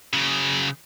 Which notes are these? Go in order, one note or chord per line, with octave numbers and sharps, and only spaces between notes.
C#3 F#3